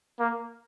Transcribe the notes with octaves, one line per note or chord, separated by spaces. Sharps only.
A#3